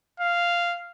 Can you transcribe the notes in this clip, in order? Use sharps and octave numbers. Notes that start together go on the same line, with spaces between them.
F5